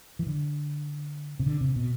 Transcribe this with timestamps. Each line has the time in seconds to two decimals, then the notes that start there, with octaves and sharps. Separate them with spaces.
0.19 E3
0.27 D3
1.39 C3
1.46 D3
1.61 C3
1.76 B2